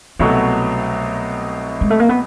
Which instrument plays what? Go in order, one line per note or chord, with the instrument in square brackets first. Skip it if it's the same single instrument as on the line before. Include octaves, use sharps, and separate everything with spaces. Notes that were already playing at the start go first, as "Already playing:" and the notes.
[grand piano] C2 B2 F#3 A3 [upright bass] B3
[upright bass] G#3
A3
A#3
B3